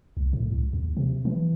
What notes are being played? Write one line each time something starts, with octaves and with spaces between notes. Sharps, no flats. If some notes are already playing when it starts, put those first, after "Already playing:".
C2
A2
C#2
D#2
C3
E3